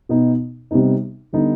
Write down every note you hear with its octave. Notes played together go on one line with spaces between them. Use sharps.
B2 B3 D#4
C3 G3 B3 D#4
D3 G3 B3 D#4